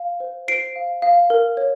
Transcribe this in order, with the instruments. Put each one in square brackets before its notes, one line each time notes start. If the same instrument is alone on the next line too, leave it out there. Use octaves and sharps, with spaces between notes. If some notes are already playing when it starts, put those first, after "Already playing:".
Already playing: [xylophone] F5
C5
C5 C7 D7
F5
F5
A#4
C#5